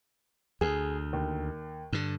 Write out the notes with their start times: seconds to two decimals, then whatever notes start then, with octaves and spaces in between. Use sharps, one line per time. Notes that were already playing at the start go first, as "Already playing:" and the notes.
0.61 D2 G#4
1.13 D#2
1.93 G2 D3